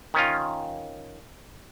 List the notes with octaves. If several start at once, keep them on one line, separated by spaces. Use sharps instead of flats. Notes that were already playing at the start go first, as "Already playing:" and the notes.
D#3 C#4 F4